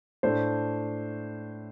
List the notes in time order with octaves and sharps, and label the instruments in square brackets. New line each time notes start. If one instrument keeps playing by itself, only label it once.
[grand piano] A2 A3 D4 C5